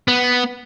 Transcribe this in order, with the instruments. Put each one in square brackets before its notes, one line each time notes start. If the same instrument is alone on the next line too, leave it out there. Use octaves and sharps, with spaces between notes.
[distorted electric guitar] B3